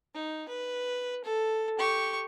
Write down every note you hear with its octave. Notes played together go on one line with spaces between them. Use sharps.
D#4
B4
A4
G4 C#6